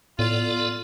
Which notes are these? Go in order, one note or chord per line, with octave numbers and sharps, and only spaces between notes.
A2 B3 F4 A4 D5